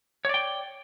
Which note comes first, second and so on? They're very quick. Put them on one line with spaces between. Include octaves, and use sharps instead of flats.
C#5 D5 G5